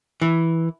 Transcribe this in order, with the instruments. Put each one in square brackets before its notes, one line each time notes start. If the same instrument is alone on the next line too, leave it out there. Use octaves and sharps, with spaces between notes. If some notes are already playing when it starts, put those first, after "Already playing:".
[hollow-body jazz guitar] E3